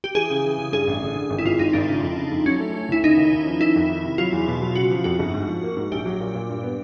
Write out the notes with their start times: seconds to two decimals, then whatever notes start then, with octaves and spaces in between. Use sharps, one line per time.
0.04 G4
0.15 E3 G#4
0.30 C#3
0.44 E3
0.58 C#3
0.72 G2 G#4
0.88 A1
1.02 D3
1.16 D3
1.30 G#1
1.38 E4
1.45 G#1 F4
1.59 G#1 D#4
1.73 G#1 D4
1.88 C#3
2.03 F2
2.16 C#3
2.31 F2
2.46 F#3 C#4
2.60 A3
2.74 A3
2.89 D2 E4
3.04 C#3 D#4
3.17 D#2
3.33 D#2
3.47 F3
3.60 D#3 E4
3.76 F2
3.89 D#3
4.04 C3
4.18 F#3 F4
4.33 E2
4.48 B2
4.61 F#3
4.75 C#3 F#4
4.91 F3
5.04 F2 F#4
5.19 G1
5.34 G#2
5.48 F3
5.63 A#3
5.77 G#2
5.91 A#1 G4
6.06 F#3
6.21 A#2
6.35 A#2
6.49 G2
6.63 B3